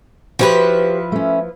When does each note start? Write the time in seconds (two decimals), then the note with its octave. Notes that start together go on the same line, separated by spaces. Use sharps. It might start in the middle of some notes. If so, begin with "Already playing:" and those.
0.39 F3 E4 F#4 G4 B4 C5
1.12 A3 C#4